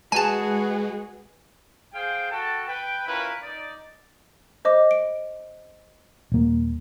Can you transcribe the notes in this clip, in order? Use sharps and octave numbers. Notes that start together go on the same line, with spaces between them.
G#3 F#4 G#4 B4 G#5 A5
G#4 C5 F5 G5
F#4 A4 G5 A5
B4 G5
C#4 E4 F4 A#4 B4
D#4 D5
C5 D#5 D6
D7
D#1 A#3